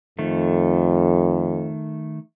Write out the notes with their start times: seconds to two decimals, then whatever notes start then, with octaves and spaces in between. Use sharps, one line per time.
0.19 F2 D#3 A3